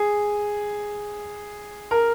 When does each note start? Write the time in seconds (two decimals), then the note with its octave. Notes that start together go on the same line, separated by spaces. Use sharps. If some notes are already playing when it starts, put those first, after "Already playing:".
Already playing: G#4
1.91 A#4